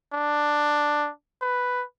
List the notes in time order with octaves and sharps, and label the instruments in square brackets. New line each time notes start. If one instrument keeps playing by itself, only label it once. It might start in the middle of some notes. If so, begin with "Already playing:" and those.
[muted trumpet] D4
B4